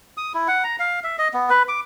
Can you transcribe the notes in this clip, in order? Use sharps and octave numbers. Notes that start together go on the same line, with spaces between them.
D#6
E4
F#5
A#5
F5
E5
D#5
B3
B4
D6